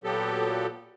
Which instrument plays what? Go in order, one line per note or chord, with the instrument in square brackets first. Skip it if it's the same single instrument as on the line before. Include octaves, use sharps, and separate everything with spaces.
[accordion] A#2 F#3 B3 G4 A4